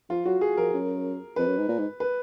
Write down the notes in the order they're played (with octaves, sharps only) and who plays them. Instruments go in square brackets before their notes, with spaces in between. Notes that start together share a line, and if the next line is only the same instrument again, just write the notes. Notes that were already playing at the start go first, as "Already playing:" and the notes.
[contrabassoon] F3 [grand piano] F4
[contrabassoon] F#3 [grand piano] F#4
[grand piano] G#4
[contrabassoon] F3 [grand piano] A#4
[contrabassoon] F#2
[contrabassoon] F2 [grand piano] B4
[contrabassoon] F#2
G#2
A#2
G#2
[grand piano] B4